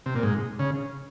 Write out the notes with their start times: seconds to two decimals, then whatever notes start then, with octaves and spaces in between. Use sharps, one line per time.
0.06 C3
0.15 A#2
0.23 G#2
0.59 C#3